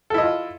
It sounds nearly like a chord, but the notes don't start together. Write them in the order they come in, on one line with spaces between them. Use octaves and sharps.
A4 E4 D#5 F4